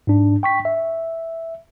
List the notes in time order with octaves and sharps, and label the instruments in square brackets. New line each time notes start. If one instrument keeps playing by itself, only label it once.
[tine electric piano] G#2 D4
G5 C#6 B6
E5